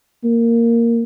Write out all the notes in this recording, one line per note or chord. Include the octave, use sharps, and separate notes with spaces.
A#3